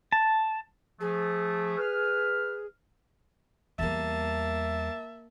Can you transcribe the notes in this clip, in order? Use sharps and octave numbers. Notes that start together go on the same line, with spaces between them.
A5
F3 A3 G#4
B4 F6
E2 G3 A#3 E5 A5